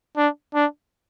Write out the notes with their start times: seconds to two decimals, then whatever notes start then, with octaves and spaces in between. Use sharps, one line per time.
0.17 D4
0.55 D4